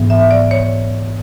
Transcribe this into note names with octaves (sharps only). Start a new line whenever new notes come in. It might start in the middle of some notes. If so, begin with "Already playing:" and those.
Already playing: G#2 E3 B3
E5
D5
C#5